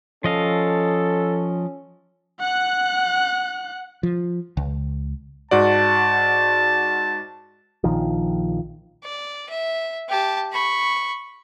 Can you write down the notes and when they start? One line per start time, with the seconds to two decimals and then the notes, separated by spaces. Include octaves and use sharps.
0.24 F3 C#4 A4 D#5 F5
2.40 F#5 F#6
4.03 F3
4.57 C#2
5.51 G#2 F#4 D5 A5
7.84 A#1 D#3 F3
9.04 D5
9.49 E5
10.09 G4 A5
10.52 B5 C#6